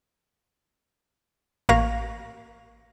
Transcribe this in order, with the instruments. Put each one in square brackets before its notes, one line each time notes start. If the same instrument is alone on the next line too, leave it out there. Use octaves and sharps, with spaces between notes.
[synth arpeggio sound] A1 A#3 F5 C#6 A#6